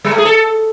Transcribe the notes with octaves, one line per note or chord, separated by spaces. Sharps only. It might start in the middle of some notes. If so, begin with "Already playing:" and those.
G3
A3
G#4
A4